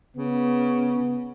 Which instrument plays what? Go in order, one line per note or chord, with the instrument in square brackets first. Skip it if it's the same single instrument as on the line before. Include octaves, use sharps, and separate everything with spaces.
[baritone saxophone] C#3 [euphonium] B3